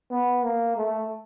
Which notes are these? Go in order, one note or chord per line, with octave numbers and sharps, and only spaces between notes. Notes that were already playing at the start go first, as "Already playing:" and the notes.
B3
A#3
A3